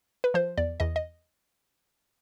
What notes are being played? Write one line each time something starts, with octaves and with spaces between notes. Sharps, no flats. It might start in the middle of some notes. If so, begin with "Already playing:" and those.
B4
F3 C5
E2 D5
E2 D#5
D#5